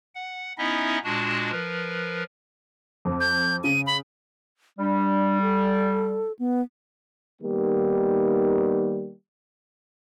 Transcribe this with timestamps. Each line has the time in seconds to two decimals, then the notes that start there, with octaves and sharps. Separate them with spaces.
0.15 F#5
0.58 B3 C#4 D#4 E4 D#5 E5
1.04 A#2 G#3 D4 F#4 A5
1.51 F3 A#4 B4
3.05 F2
3.20 G6
3.64 C#3 D#7
3.87 B5
4.79 G3 D4
5.42 A4
6.39 B3
7.42 D#3 G3 A#3 B3 D#4 G4